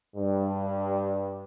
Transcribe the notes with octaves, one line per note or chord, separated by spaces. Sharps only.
G2